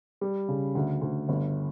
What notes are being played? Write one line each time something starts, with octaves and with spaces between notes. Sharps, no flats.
G3
C#3
D2
D2
G1